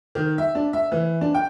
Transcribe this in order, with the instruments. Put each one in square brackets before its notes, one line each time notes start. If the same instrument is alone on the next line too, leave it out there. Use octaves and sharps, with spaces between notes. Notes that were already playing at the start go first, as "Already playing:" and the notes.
[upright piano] D#3
E5
D4
E5
E3
D4
G5